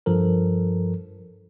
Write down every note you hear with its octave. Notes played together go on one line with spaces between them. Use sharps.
G2 F3 A4 A#4